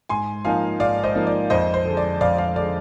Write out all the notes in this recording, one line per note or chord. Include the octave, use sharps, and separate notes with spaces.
G#2 G#5 C6
F3 A#3 D#4 F5 G#5
G#2 D5 F5
C5 D#5
F3 A#3 D#4
D5
F2 C5 D#5
C5
D3 G#3
D5
F2 D5 F5
D5 F5
D3 G#3 D5